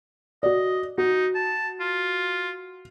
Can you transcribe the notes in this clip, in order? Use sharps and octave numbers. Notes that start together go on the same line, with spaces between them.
F#4 D5 D#5
D#4 F#4
A5
F4